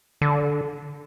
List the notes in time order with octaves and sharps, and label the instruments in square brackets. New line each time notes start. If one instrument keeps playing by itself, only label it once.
[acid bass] D3